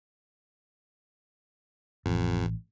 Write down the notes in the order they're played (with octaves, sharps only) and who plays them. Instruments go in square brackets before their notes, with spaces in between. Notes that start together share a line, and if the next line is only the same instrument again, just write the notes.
[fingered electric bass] A1 [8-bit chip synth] F2